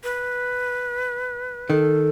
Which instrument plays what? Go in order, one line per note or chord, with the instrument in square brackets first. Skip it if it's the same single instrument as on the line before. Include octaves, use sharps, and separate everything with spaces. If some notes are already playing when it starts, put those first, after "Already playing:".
[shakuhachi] B4
[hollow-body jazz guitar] D#3 [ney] A4